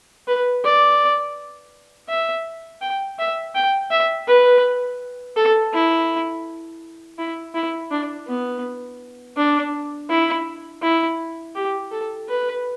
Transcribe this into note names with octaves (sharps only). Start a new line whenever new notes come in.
B4
D5
E5
G5
E5
G5
E5
B4
A4
E4
E4
E4
D4
B3
D4
E4
E4
G4
A4
B4